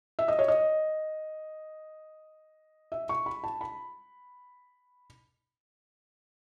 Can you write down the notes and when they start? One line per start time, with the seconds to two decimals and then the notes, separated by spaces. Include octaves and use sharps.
0.19 E5
0.28 D#5
0.39 C#5
0.48 D#5
2.92 E5
3.09 C#6
3.26 B5
3.44 A5
3.61 B5